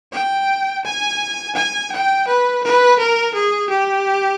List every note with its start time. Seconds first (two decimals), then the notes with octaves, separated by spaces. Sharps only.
0.12 G5
0.84 G#5
1.55 G#5
1.92 G5
2.27 B4
2.63 B4
2.99 A#4
3.34 G#4
3.69 G4